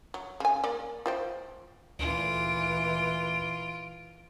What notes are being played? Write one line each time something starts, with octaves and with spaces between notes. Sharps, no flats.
F#3
C#3 G#5
A#3 D5
F4 C5 G5
D2 A#2 E3 F4 D7